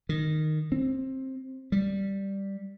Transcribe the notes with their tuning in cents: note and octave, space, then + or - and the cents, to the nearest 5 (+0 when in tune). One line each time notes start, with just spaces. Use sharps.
D#3 -10
C4 +15
G3 +0